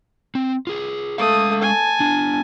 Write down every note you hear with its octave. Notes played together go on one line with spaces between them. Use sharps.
C4
F4 G#4
G#3 A3 F5 D#6
G#5 A5
B3 D4